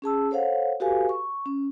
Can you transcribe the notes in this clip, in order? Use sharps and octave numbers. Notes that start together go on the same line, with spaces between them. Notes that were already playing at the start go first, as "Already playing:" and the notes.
C#4 G#4 A5 E6
A4 C5 C#5 F5 F#5
F#4 G4 A4 B4 F5 G#5
C#6
C#4